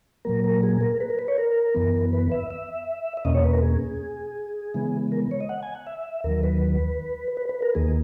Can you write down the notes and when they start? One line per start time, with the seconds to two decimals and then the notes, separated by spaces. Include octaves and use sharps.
0.25 A#2 F#3 A#3 A#4
0.44 A#4
0.63 G#4
0.81 A#4
1.00 B4
1.10 A#4
1.19 B4
1.28 C#5
1.38 A#4
1.74 F#2 E3 B3
2.13 B4
2.32 E5
2.50 E5
3.17 E5
3.25 E2 B2 A#3 C#4 D#5
3.35 C#5
3.44 B4
3.53 A#4
3.62 G#4
4.74 C#3 E3 G#3 B3
5.12 A#4
5.31 C#5
5.40 D#5
5.49 F#5
5.63 G#5
5.75 F#5
5.87 E5
6.24 D#2 D#3 F#3 A#4
6.43 B4
7.37 B4
7.49 B4
7.62 A#4
7.75 D#2 D#3 A#3 G#4